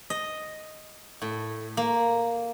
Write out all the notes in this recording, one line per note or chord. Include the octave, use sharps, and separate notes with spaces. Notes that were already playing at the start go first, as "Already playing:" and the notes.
D#5
A2
A#3